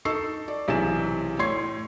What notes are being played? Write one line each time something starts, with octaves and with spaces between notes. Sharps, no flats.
D#4 A4 C#6 E6 C7
D5
B1 C3 E3 G#4 E7
A2 C#5 C6 G#6 C7